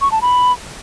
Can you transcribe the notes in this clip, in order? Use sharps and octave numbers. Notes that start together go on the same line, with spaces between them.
C#6
A5
B5